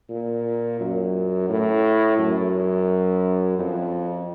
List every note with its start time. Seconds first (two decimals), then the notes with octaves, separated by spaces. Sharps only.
0.10 A#2
0.80 F#2
1.49 A2
2.19 F#2
3.59 F2